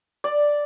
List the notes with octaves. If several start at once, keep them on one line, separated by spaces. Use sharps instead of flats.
D5